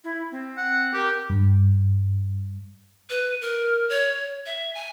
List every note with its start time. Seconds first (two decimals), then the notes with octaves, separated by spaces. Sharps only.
0.04 E4
0.31 C4
0.58 F#5
0.94 G4 A#4
1.30 G2
3.10 B4
3.41 A#4
3.89 C#5
4.46 E5
4.75 G#5